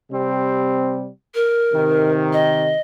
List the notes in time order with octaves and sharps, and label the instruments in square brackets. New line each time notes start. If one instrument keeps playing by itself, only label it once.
[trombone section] C3 G3 C4
[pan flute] A#4
[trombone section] C3 D#3
[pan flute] D#5